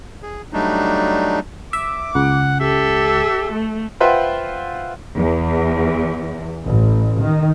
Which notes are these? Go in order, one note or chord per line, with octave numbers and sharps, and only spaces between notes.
G#4
F#3 G3 A3 D4 D#4
E5 D6
C#2 F#5
G4 A4 E5
A3
F4 B4 C5 E5 F#5 G5
E2
A1
D#3